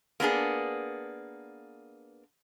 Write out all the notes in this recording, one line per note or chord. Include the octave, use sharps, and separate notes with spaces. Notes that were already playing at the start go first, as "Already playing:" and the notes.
A#3 B3 D4 G#4